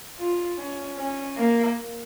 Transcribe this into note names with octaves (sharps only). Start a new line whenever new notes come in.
F4
C#4
C#4
A#3